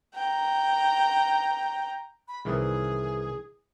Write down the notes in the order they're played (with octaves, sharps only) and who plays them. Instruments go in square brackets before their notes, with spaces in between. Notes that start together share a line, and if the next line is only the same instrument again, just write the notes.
[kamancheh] G5 A#5
[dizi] B5
[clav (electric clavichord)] C2 D#3 E3 [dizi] G#4